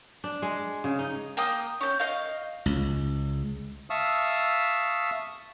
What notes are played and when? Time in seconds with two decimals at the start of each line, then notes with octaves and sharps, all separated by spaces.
0.24 D4
0.42 G#3
0.84 C#3
0.99 D#4
1.37 A#3 G5 D#6
1.81 C#4 G6
2.00 D#5 F5
2.66 C#2
3.90 E5 F5 A5 C#6 D#6 E6